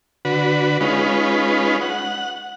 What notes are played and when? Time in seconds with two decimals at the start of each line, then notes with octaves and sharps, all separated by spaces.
0.25 D3 F#4 B4
0.81 G#3 C#4 D#4 F4 B4
1.81 F#5